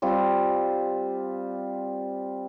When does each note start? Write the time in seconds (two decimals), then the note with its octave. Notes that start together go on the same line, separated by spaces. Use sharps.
0.02 G3 C4 F4